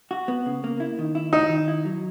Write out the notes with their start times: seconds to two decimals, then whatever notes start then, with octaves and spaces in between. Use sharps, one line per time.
0.11 F#4
0.28 B3
0.46 C#3
0.64 A#3
0.80 E4
0.99 D#3
1.15 E4
1.33 D#4 E4
1.49 D#3
1.68 E4
1.85 F#3